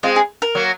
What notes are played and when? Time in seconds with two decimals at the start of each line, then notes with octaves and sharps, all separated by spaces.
0.03 G#3 C4 F4
0.16 G#4
0.42 A#4
0.55 F#3 A#3